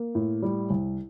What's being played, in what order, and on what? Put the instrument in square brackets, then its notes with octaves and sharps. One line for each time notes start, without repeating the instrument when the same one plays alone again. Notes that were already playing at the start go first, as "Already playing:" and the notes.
Already playing: [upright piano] A#3
A2
G3
C2